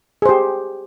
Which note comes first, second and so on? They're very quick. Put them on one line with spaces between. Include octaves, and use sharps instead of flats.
G#4 C5 G4